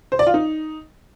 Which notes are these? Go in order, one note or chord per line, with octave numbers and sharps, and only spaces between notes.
C5
D5
F4
D#4